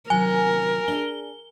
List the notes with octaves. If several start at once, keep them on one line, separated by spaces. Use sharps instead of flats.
C3 D#3 F#3 A#4 G#5
D4 G#4 G7